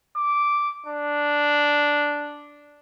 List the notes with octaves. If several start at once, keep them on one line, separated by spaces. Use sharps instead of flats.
D6
D4